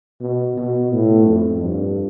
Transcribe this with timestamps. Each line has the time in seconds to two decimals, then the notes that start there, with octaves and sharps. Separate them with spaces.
0.21 B2
0.57 B2
0.93 A2
1.29 F2
1.65 G2